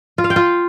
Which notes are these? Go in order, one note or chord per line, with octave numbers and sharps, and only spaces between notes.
F4
F5
G5
F4